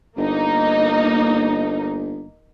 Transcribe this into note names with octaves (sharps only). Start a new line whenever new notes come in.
G1 A#3 D#4